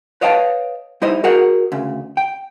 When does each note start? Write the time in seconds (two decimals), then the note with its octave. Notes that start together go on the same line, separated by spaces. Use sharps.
0.21 B4 C#5 D#5 F5 G5 A5
1.02 G3 D#4 E4 C5 D#5
1.24 F#4 G#4 A#4 D#5 F#5
1.72 D2 C#3
2.17 G5